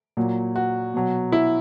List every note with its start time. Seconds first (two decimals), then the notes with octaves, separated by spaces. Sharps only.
0.17 A#2 F#3
0.56 F#4
0.94 B2 F#3
1.32 E4